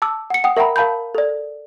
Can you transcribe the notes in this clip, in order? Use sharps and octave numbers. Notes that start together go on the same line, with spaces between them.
A5 D6 E6
F#5 C#7
F#5 G5 D#6
A#4 E5 F#5 G5 A#5 B5
A#4 F5 A5 B5 G6
A4 D5